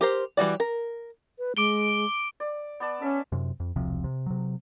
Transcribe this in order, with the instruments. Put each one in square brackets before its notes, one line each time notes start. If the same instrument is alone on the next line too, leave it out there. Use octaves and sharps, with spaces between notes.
[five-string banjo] G4 A#4 C5
E3 G3 F#4 D5
A#4
[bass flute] B4
[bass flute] G#3 [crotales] D6 D7 G7
[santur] D5
B3 D5 A5
[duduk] C#4 [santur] A4 E5
[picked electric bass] F#2 C3
F2
E1 C2 C3 F3
C3
C3 F#3